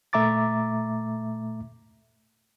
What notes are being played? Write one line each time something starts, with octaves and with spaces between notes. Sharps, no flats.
A#2 A3 E5 A#5 D6 A6